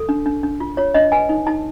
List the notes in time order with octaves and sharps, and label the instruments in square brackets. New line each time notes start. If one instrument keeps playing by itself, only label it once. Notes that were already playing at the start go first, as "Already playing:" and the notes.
Already playing: [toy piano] A4
D4
D4
D4
F4
F4 C#5
D4 D#5
B4 G#5
D#4
D#4 A5